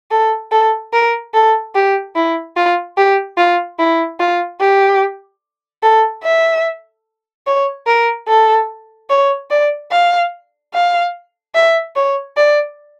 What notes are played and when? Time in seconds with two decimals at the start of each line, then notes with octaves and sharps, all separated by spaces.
0.11 A4
0.51 A4
0.93 A#4
1.34 A4
1.75 G4
2.16 E4
2.56 F4
2.97 G4
3.38 F4
3.79 E4
4.20 F4
4.60 G4
5.83 A4
6.24 E5
7.47 C#5
7.87 A#4
8.28 A4
9.10 C#5
9.51 D5
9.92 F5
10.74 F5
11.55 E5
11.96 C#5
12.37 D5